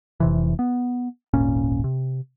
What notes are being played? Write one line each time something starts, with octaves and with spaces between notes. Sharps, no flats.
F1 C3 E3
B3
D#1 G#1 A#2 C#4
C3